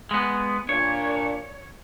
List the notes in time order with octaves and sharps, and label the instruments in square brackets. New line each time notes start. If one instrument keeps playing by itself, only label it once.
[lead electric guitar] G#3 B3
[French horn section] A#2 D4 [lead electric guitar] C#5